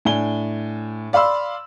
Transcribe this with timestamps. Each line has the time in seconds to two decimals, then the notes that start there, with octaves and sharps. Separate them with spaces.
0.05 A2 D4 G#5 G7
1.13 D5 F5 B5 C6 E6